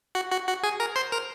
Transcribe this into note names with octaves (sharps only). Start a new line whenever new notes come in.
F#4 F#5
F#4 F#5
F#4 F#5
G#4 G#5
A#4 A#5
C5 C6
A#4 A#5